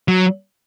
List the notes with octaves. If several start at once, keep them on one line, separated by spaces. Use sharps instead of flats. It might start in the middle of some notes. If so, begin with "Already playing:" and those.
F#3